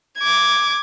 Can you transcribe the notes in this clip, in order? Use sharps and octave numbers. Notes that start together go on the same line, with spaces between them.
D6 G#6